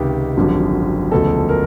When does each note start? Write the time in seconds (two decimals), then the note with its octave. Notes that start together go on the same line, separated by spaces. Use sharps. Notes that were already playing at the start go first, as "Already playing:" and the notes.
Already playing: C#2 C3 D#3 G4
0.37 G#1 F#2 D3 F3
1.11 E1 D2 C#3 F3 A4
1.49 A#4